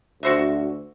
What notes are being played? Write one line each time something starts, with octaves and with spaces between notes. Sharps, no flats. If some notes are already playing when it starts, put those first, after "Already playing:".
D2 F#4 C5 E5